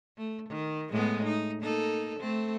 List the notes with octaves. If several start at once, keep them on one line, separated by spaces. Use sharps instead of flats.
A3
D#3
A2 G#3 B3
D#4
A#3 D#4 A4
A3 C4